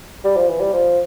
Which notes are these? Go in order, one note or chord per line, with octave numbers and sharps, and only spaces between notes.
G3
F3
E3
G3
F3